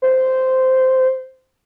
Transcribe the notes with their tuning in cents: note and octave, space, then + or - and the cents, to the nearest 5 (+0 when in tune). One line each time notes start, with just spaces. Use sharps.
C5 -10